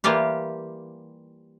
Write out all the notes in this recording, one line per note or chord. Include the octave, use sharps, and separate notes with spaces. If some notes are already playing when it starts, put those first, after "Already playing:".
E3 G3 A#3 F4 G4